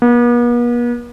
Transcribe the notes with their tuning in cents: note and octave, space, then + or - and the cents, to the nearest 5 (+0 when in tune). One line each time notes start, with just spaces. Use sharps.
B3 -45